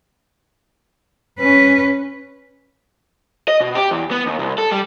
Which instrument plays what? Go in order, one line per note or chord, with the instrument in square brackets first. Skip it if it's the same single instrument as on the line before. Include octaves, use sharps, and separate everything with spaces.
[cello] C#4 B4
[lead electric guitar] D#5
B2
G4
E2
B3
D#2
C2
A4
G3